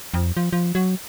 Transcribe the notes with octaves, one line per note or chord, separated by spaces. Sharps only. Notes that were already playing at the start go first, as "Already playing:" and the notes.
F2
F3
F3
F#3